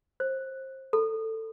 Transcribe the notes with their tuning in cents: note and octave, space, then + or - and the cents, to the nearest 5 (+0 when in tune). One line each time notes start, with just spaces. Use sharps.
C5 +25
A4 +15